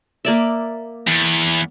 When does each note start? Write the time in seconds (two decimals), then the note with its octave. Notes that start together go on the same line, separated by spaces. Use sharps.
0.25 A#3 D5 E5
1.07 E2